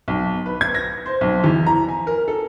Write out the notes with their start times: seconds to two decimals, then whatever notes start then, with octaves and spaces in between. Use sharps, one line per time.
0.08 B1
0.46 B4
0.61 G#6
0.75 A#6
1.06 C5
1.21 B1
1.44 E2
1.67 A#5
1.88 G#5
2.07 A#4
2.28 A4